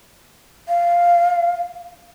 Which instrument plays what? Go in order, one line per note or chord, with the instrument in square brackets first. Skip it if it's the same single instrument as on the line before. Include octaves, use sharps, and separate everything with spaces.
[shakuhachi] F5